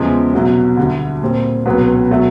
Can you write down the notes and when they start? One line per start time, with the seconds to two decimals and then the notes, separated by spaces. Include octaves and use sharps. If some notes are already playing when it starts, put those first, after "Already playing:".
Already playing: E2 C#3 F3 G#3
0.33 C2 B2 F#3
0.77 D2 D3 G3
1.22 A#2 G3 C4
1.66 C#2 B2 F#3 B3
2.10 B2 F#3 A3